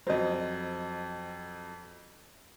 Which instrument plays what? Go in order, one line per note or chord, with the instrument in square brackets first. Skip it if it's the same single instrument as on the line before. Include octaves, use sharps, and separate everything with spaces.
[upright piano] F2 F#3 [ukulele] C5 D#5